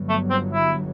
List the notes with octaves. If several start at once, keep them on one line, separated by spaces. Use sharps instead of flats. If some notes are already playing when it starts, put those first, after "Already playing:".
Already playing: G1 G2 F#3
A3
C4
E4